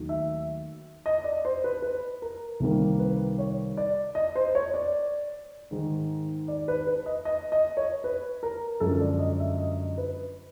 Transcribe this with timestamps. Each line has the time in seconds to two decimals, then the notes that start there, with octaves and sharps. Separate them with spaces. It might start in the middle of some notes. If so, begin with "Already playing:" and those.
Already playing: D#2 D#3 F#3 A3
0.09 E5
1.06 D#5
1.24 D5
1.45 C5
1.64 B4
1.82 B4
2.22 A#4
2.60 C2 C3 D#3 G3 A#3 A#4
2.99 B4
3.39 C#5
3.77 D5
4.15 D#5
4.36 C5
4.55 C#5
4.74 D5
5.71 G#2 D#3 G#3
6.48 D5
6.68 B4
6.87 B4
7.06 D#5
7.25 D#5
7.52 D#5
7.77 C#5
8.04 B4
8.43 A#4
8.80 F#2 D3 F3 G#3 A4
9.01 D5
9.19 D#5
9.39 E5
9.58 D#5
9.98 B4